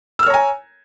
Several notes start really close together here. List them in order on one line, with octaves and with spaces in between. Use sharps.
E6 F6 C#5 A#5 G#5